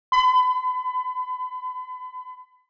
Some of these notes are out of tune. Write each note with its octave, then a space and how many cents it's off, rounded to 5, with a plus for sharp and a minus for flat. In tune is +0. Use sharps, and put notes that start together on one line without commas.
B5 +35